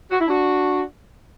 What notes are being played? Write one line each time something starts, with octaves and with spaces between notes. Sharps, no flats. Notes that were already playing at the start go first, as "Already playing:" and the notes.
F#4
E4
D4 F#4